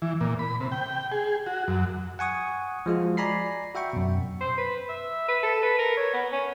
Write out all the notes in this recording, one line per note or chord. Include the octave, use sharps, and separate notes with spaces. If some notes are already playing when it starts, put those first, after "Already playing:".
E3
A#2
B5
C3
G5
G#4
F#4
F#2
F#5 G#5 C#6 D#6
F3 G#3 F4 F#4
D5 G#5 A#5 B5 C7
F#4 E5 G5 C#6
F#2 B2
C5
B4
E5
B4
A4
B4
A#4
C#5
B3
C#4